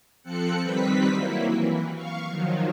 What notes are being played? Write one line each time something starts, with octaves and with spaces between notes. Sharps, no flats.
F3 C4 A4 F#6 C#7
D#3 G3 C4 B4 B6
F#3 A#3 E4
E3
F5 C#6
D#3 F3 F#3